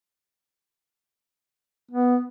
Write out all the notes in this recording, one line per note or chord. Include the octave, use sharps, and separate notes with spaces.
B3